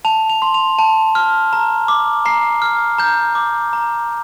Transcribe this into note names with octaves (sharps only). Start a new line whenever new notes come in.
A5 F7
F7
C6
F7
A5
F6
A#5
D6
A#5 C7
F6
A#5 G6
D6
A#5